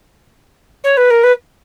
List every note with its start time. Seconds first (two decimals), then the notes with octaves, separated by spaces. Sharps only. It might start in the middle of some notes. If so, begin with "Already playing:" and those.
0.84 C#5
0.97 B4
1.10 A#4
1.23 B4